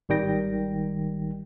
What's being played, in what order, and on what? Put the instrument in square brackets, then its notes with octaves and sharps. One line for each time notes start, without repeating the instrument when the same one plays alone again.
[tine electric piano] G#1 D#3 G3 G5 A#6